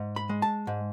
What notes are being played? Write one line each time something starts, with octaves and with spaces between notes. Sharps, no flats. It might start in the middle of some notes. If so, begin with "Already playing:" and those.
Already playing: G#2
B5
G#3
A5
G#2